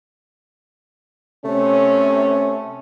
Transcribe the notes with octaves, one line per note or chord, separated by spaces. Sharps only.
C3 A3 C#4